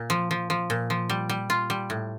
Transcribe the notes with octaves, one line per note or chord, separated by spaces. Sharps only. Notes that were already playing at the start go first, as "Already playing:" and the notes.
Already playing: A#2
F3
F3
F3
A#2
F3
G3
G3
F4
G3
A2